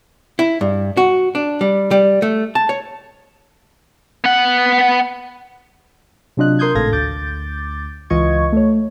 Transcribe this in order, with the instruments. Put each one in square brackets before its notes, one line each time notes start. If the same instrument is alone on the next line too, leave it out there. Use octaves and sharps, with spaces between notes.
[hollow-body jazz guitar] E4
G2
F#4
D4
G3
G3
A3
A5
C#5
[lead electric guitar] B3 F#5
[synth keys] C3 F#3 D4 F4 D#5 F#6
A#4 C6 D#6 G6 G#6
G#1 A2 A4 F5 G#6 A#6
D2 D6 G6 A6
C#2 E3 F4 D#5 C#6 G#6
A3 C#5